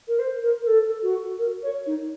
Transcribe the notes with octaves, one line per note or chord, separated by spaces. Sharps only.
A#4
C5
A#4
A#4
A4
F#4
A#4
C#5
D#4